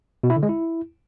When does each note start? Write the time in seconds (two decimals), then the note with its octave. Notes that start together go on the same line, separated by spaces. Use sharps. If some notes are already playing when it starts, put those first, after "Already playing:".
0.23 B2
0.30 E4
0.36 D3
0.43 G#3
0.49 E4